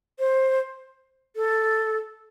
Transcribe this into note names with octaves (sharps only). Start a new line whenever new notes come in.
C5
A4